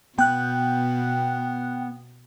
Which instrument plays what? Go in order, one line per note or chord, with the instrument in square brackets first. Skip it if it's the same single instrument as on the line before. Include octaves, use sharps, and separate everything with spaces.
[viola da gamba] B2 [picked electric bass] B3 [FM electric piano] G5 F#6